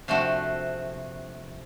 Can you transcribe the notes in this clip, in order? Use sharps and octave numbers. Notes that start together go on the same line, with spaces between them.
C3 F3 A3 D4 F#4